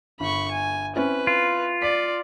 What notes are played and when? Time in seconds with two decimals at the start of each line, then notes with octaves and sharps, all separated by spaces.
0.20 G1 B5 C#6
0.52 G#5
0.96 C4 C#4 E4 B4
1.27 F4
1.82 D5 B6